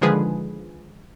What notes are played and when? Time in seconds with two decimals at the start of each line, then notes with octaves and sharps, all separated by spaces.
0.01 D3 D#3 F3 G#3 G#4 B4